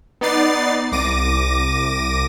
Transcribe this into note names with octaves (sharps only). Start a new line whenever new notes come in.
B3 D#4 D5 A6 C7
C2 D6 A#6 D#7